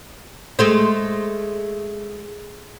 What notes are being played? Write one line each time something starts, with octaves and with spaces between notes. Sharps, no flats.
G#3 A3 C5